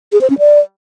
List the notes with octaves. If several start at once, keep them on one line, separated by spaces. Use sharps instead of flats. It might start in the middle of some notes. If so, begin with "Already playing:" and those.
G#4
C5
C#4
D5